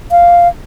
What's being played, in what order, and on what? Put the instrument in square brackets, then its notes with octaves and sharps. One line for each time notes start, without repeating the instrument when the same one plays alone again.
[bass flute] F5